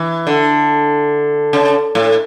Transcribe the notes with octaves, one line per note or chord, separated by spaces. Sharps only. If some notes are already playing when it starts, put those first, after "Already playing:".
Already playing: E3
D3
C#3
A2